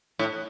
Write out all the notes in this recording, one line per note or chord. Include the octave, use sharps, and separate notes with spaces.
A2